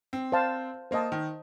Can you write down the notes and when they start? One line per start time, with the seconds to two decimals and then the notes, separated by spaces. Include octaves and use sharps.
0.13 C4
0.32 C5 F5 A5
0.91 A#3 C5 D#5 A5
1.12 D#3